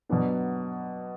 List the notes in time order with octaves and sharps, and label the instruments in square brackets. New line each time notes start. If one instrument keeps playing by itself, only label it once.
[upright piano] B2 F#3 B3 D4